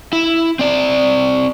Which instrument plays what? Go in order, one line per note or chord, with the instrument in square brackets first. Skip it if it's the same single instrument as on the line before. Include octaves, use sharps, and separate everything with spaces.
[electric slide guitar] E4
C4 D5